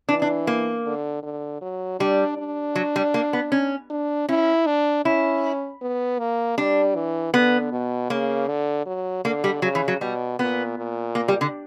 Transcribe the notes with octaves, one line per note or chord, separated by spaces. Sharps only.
E3 D4
D4
A#3
D3
D3
F#3
G3 D4
D4
F#3
G3
A#3
B3
C#4
D4
C#4 E4
D4
C#4 E4
B3
A#3
G3 D4
E3
D3 B3
B2
C#3 A#3
D3
F#3
D3 A#3
G3
C#3 F#3
E3
F#3
B2 G3
A#2 B3
A#2
A#3
G3
D3